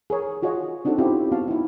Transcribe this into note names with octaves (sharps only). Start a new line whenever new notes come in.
G#4 A#4 C#5
F4 F#4 G#4 C#5 D#5
C4 D4 D#4 F#4 A4
C4 C#4 E4 F4 G4 E5
B3 C4 F#4 F5 A5
D#4 E4